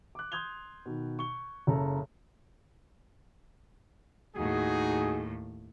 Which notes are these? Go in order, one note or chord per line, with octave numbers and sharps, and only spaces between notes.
D6 F#6
C6 D#6 G6 G#6 F7 G7
B2 D#3
C#6 G7
F#1 C#3 A4 A#5
D#2 A2 D#4 F#4 G#4